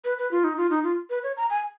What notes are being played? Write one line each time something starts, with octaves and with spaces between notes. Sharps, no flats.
B4
B4
F4
D#4
F4
D#4
F4
B4
C#5
A#5
G#5